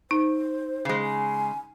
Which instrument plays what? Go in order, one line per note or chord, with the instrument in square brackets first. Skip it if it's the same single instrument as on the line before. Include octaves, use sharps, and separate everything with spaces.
[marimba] D#4 [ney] C5
[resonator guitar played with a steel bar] C#3 G#3
[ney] G#5